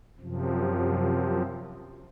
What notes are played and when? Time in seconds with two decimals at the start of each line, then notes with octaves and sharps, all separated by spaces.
0.20 F#2 C3 F3